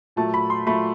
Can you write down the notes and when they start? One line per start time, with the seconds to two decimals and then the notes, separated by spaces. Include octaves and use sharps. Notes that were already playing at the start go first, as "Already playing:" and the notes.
0.16 A#2 F#3 A3 A5
0.34 B5
0.50 C6
0.67 A#2 F#3 A3 B5